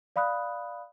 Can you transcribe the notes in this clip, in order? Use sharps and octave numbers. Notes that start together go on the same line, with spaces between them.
D5 F5 B5 D#6 F#6